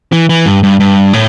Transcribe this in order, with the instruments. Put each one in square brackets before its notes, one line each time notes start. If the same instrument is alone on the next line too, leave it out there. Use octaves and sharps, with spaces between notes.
[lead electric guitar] E3
E3
G2
G2
G2
A2